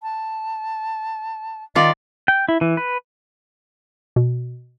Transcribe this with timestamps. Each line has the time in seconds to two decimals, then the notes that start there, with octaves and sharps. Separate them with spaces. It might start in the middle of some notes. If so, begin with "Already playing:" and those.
0.03 A5
1.75 D#3 F4 D5 D#5
2.28 G5
2.49 E4
2.61 E3
2.77 B4
4.16 B2